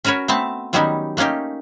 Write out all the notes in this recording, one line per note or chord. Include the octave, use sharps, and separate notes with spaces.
C#4 F#4 A#4 B4 C#5
A3 B3 C4 A5
D#3 F#3 G3 B3 C#4 D#4
A3 A#3 C#4 D#4 G4